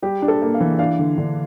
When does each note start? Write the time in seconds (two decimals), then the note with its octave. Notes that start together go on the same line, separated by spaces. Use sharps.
0.02 G3 G4
0.22 D4
0.28 A4
0.42 A#3
0.54 F5
0.60 E3
0.79 D4 F5
0.99 D3
1.18 D3